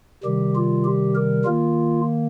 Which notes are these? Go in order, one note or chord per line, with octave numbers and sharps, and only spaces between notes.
C3 D#3 G3 G4
F4
G4
A#4
D#3 A#3 F4